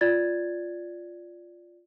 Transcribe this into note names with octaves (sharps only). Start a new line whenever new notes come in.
F4 D5 G#6 A6